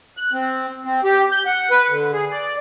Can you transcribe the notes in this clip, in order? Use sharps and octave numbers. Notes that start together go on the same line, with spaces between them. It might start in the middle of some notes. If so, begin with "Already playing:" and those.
F#6
C4
C4
G4
G6
F#5
B4
D3
G#4
D5